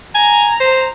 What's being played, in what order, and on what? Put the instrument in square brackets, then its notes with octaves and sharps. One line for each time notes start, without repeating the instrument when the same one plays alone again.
[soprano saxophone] G#5 [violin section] A#5
[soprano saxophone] C5